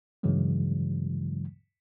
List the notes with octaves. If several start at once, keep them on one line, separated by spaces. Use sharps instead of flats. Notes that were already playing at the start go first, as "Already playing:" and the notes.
G2 C#3 E3 F#3 G#3